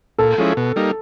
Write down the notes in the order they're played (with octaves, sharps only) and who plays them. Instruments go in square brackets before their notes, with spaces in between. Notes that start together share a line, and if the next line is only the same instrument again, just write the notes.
[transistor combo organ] A#2 [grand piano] A4
[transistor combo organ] F3 G#3 C#4 E4
B2
G3 A#3 D#4